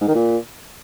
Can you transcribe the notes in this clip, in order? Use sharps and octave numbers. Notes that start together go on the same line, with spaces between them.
G#2
D#3
A#2